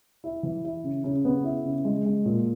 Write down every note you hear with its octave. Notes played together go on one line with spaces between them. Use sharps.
E4
E3
E4
C#3
C#3
B3
E4
C#3
G#3
G#3
A#2